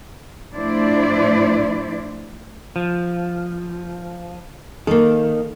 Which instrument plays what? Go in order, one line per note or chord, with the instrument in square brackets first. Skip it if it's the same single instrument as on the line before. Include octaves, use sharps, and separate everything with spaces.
[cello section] A2 F3 D4 E4 C5 D5
[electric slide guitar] F3
[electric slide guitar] D#3 [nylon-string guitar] A#3 A4